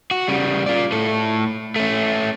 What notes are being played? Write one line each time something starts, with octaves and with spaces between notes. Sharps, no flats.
F#4
C#3 G3
F4 D5
A2 A4
A3 C#4